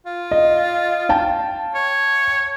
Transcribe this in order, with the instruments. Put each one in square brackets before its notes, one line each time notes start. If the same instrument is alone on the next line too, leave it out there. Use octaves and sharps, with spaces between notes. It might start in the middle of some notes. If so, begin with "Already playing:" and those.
[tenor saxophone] F4
[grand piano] D#5
F5 G5 A5
[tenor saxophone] C#5